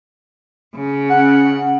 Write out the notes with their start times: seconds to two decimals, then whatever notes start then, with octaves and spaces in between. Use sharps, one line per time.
0.75 C#3
1.09 C#4 F#5